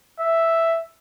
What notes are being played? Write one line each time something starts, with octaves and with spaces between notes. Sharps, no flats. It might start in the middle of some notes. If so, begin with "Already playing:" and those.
E5